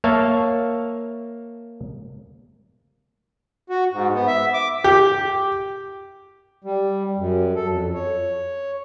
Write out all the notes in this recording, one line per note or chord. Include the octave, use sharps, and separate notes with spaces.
A#3 C#5 E5 F5 A5
F#4
G#2
B3
E5
D6
G4
G3
F#2
A4
F2
C#5